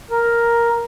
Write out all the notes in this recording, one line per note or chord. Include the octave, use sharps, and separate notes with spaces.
A#4